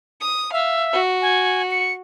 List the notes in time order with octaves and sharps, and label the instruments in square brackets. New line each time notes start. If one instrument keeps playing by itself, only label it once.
[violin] D#6
[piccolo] E5 [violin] F5
[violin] F#4
[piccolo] G#5
C#7